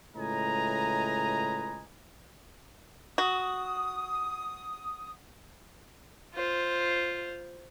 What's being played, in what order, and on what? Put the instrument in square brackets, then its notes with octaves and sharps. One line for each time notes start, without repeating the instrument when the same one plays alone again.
[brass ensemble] C#2 A2 B4 D#5 G#5 A#5
[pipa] F#4 [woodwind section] D#6
[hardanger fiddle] F4 C5